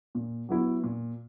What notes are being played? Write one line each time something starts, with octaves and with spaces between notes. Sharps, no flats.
A#2
F#3 B3 E4
A#2